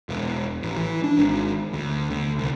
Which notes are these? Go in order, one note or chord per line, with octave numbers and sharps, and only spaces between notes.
E1
A1
E3
D4
G#1
D2
D2
C2